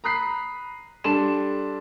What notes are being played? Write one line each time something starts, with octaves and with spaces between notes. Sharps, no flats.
A#5 B5 D#6 F#6 B6 C7
G3 D4 A4 C6 E7